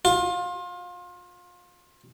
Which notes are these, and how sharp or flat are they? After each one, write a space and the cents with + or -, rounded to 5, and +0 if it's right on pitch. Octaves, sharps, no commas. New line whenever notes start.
F4 +25